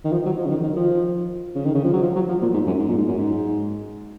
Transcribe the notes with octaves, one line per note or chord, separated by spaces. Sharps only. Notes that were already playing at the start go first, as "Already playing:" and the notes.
D#3
F3
F#3
F3
C#3
D#3
D#3
F3
C#3
D#3
C#3
F3
F#3
F3
F#3
F3
A#2
G#2
F#2
G#2
A#2
G#2
F#2
G#2